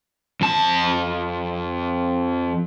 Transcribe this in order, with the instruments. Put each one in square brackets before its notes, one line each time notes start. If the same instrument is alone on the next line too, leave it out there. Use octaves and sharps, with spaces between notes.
[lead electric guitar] F2 A5